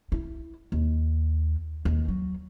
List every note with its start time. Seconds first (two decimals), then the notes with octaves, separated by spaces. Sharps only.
0.12 E4
0.72 D#2
1.85 D#2
2.08 F#3